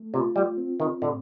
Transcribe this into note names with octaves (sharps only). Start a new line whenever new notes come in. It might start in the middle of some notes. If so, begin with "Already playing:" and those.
Already playing: A3
C3 F4
G3
C4
D#3
A2 D3